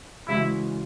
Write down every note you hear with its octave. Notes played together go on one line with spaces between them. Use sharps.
C#3 E3 G#3 C#4 E4 F#4